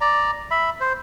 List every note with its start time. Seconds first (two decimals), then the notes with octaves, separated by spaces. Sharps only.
0.01 D5 A#5
0.51 E5 B5
0.81 C5